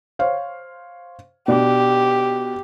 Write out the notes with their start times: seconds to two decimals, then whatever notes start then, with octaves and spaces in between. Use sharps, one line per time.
0.19 C5 C#5 F5
1.48 B2 D4 G4